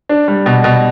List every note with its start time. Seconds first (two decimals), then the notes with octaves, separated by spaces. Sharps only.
0.09 D4
0.28 G3
0.46 B2
0.64 B2